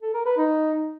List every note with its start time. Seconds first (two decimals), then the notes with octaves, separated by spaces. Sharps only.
0.02 A4
0.14 A#4
0.26 B4
0.37 D#4